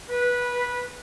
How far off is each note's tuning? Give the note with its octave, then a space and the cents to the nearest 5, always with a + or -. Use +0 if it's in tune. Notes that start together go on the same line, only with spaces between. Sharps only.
B4 -15